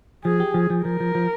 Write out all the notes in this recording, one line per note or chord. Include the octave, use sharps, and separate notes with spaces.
F3 G#4
G4
F3
F3
F3 A#4
F3
F3